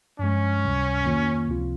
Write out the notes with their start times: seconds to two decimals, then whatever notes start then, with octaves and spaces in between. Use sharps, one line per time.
0.19 G2 F3 G#3 C#4
0.62 C#2 C3 G3
1.05 F2 D#3 A#3 F4
1.48 C#2 C3 F3 C4 F4